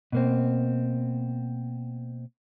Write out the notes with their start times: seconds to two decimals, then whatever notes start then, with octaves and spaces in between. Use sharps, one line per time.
0.12 B2 A#3 C4